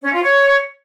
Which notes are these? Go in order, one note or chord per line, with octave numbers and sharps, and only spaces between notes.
C#4
F4
C#5